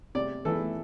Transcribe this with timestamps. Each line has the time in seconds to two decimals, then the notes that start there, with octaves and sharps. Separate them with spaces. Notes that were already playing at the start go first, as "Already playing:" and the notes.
0.15 C3 D5
0.45 E3 A3 E4 A4